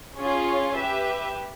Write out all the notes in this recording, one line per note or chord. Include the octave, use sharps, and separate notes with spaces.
C#4 F4 G#4 C#5
G4 B4 E5